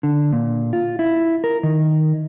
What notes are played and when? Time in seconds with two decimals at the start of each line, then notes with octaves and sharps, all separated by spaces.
0.03 D3
0.33 A#2
0.73 F4
0.99 E4
1.44 A#4
1.63 D#3